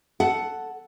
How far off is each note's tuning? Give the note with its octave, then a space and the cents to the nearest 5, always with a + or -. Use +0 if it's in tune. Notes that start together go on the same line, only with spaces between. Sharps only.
A4 +0 F#5 +5